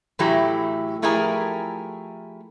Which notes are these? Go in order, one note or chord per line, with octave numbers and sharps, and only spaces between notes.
A2 E3 F#3 A3 E4 G4
F3 A3 E4 G4 G#4 A#4